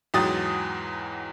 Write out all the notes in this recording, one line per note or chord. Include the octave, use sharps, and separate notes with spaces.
E2 G#2 F#3 G5 D#6 A6